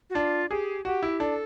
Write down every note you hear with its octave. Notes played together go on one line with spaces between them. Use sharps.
F#4
D4 F4
G4 G#4
F#4 G4
E4
D4 A4